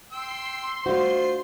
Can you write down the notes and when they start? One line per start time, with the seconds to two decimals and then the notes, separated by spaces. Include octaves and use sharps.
0.12 G5 C6 E6
0.86 A3 D4 F4 F#4 C5